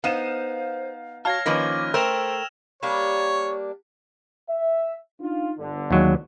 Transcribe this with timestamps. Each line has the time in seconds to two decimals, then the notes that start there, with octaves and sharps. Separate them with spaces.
0.04 B3 D#4 C5 F5 D#7 E7
1.25 F#4 C#5 F5 A5 F6 G#6 A#6
1.46 D#3 F3 A#3 C#4 B4 D#5 D6
1.94 A3 A#4 C5 G5 E6 E7 F7
2.83 G3 A#3 D4 C#5
4.49 E5
5.21 D4 D#4 F4
5.59 G1 D3
5.91 D#2 F#3 G#3